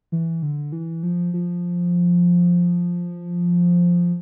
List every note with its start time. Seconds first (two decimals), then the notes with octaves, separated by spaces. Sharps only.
0.12 E3
0.42 D3
0.72 E3
1.03 F3
1.34 F3